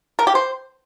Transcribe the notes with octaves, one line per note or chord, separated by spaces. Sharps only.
A#4
G4
C5